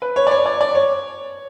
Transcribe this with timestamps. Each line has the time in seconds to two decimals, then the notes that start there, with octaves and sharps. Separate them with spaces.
0.02 B4
0.16 C#5
0.27 D5
0.31 C#5
0.46 D5
0.61 D5
0.75 C#5